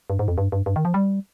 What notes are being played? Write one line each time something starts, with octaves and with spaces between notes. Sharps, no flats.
G2
G#2
F2
G2
G2
G2
D#3
F3
G3